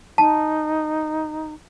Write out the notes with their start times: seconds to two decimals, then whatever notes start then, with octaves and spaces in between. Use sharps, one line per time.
0.18 D#4 A5